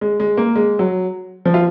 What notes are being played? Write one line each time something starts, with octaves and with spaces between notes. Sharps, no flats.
G#3
G#3
A#3
G#3
F#3
F3
F4